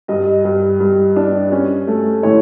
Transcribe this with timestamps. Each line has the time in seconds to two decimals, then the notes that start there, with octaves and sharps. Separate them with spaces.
0.08 G2 D#5
0.45 G2
0.80 G2
1.16 D4
1.52 C#4
1.87 A3
2.23 A2 C#5